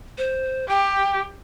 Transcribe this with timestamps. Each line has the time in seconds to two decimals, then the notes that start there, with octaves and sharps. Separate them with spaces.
0.18 C5
0.69 G4 G5